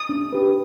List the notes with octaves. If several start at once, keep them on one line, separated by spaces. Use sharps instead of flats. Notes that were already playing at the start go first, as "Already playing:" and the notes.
Already playing: D#6
D4
G4 B4